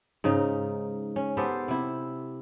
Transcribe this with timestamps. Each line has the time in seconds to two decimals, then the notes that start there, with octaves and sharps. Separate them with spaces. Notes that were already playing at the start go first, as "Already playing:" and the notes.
0.24 G#2 C#3 D#4
1.16 C#4
1.37 B3 G4 A4 C5
1.68 C3 E4